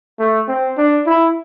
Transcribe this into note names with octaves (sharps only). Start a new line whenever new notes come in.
A3
C4
D4
E4